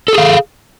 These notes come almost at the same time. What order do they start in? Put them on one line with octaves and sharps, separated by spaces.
A4 G#4 F5